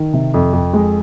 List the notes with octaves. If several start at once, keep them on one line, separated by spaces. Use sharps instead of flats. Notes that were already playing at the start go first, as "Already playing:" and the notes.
Already playing: D#3
C3
F2
F2
G#3